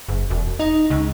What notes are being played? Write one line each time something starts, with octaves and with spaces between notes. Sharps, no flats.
F#1
E1
D#4
C#2